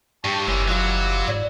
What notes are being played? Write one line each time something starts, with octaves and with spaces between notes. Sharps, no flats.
G2 G4 G5 A5 C#6
F#1 E3 G3 G#3 C#4 A#4 E6
D#3 F#3 F4 F#4
G#2 D5